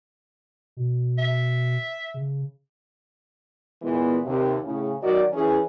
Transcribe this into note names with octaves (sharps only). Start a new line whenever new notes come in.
B2
E5
C#3
A#2 E3 G#3 B3
D#2 C3
A2 C#3
D#3 F#3 F#4 A#4 D5 D#5
E3 C#4 G#4